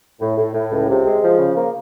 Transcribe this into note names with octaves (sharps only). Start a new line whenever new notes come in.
A2
A2
A2
C#2
C3
G#3
F3
C#3
A#3